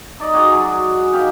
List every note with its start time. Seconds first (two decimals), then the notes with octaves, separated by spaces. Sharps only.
0.19 D#4 D5 D#5
0.33 F#4 G#4 C#5 D5
0.52 F#3 G#4
0.66 D6
0.96 F#5
1.13 D#3 G4 F5 G5